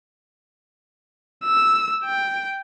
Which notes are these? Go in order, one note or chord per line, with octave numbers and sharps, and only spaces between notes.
E6
G5